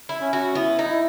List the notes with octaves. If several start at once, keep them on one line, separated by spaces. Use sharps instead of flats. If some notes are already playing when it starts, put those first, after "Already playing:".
E4
C#4
F#4
B3 E4
D#4
E4